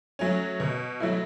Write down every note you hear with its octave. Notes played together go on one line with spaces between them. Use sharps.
F#3 A3 C#4
B2
F#3 A3 E4